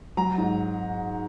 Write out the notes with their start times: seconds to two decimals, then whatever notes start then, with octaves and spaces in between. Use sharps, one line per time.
0.17 F#3 A#5
0.38 G#2